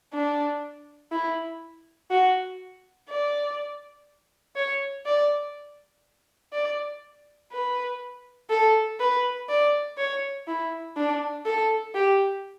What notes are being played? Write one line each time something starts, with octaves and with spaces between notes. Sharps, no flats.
D4
E4
F#4
D5
C#5
D5
D5
B4
A4
B4
D5
C#5
E4
D4
A4
G4